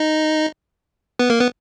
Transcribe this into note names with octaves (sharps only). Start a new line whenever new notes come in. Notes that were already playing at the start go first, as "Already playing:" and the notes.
Already playing: D#4 D#5
B3 B4
A#3 A#4
B3 B4